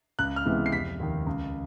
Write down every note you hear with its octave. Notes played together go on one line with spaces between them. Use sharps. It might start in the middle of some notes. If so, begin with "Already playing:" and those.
C#2 F#6
F6
C3 E3 G#3 B3
C7
F1 B6
D#2 D#3
C#2